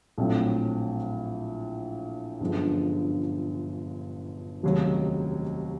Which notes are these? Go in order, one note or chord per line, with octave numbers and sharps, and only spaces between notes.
A#1 A2 F#3 A3 C4
G1 F#2 D3 F3 G#3
F1 D#2 C#3 F#3